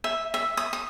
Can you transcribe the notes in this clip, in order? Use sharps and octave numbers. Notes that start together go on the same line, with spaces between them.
E5
E5
D#6
D#6